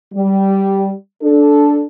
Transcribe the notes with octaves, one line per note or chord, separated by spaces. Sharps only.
G3
D4 A4